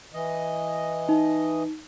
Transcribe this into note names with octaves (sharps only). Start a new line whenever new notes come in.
E3 D#5
D#4